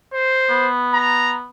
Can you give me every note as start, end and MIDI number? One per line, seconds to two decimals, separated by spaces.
0.13 0.68 72
0.50 1.48 59
0.93 1.32 82